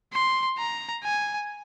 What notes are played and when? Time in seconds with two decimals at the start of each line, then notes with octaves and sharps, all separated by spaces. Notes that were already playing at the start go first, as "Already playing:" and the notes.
0.13 C6
0.59 A#5
1.04 G#5